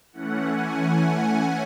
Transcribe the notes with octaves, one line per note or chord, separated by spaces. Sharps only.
E3 A3 C#4 F#5
G#5